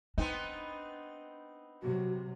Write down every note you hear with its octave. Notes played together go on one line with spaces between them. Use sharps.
B3 C4 D4 D#4
C3 F#3 F#4